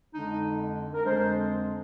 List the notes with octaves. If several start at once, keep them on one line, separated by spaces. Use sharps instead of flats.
F2 D3 G#3 D4 D#4
A#4
F2 D3 G#3 D4 C5